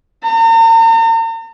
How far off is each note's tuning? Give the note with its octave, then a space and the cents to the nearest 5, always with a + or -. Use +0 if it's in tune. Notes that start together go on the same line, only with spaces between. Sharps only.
A#5 -45